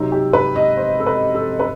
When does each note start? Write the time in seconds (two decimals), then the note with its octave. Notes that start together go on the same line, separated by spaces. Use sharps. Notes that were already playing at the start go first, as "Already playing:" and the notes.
Already playing: C3 F#3 C4 D#4
0.12 G4
0.33 B4
0.56 D#5
0.77 C5
1.00 A4
1.07 B4
1.35 A4
1.60 B4